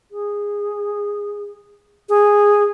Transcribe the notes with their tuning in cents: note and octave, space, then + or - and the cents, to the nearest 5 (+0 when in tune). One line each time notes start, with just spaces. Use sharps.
G#4 -15
G#4 -10